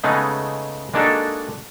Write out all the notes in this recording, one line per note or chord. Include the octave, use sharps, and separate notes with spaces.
C#3 G#3 A3 B3 D#4
G#3 A#3 D4 D#4 F#4 A4